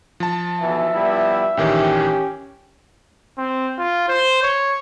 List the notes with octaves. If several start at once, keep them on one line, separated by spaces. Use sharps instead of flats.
F3 A5
B1 B2 E3 E5
G3 B3 E4
A#1 D#3 E3 C#4 G4
C4
F4
C5
C#5